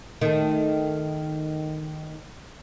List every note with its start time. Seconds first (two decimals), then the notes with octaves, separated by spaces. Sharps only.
0.21 D#3 A3